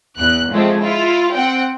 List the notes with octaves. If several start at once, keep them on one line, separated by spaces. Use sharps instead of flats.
E2 F#6
F3 G#3 A3 C4
E4 F4
C4 F#5 G5